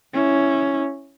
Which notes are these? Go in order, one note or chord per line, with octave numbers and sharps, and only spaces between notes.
C#4 E4